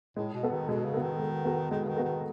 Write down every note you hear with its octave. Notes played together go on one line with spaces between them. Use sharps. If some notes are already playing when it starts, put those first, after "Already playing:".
A2 G#3
B2
B3 F#4 A4
D#3
B2 G#3
C#3
B3 F#4 A4
D#3
G#3
B3 F#4 A4
D#3 G#3
C#3
D#3
B3 F#4 A4
D#3